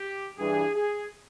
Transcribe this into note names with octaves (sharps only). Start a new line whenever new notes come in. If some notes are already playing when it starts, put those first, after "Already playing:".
Already playing: G4
G2 E3 G#4
G#4